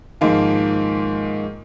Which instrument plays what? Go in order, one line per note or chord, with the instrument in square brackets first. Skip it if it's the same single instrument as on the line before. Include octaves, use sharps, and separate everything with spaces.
[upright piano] G#2 D#3 F3 A#3